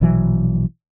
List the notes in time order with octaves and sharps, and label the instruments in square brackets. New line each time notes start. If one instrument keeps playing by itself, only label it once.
[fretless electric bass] A#1 B2 E3 F#3